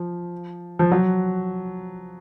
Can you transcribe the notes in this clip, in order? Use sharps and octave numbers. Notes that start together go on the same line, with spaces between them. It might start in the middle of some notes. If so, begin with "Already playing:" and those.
Already playing: F3
F3
F#3